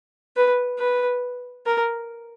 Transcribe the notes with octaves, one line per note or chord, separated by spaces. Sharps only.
B4
B4
A#4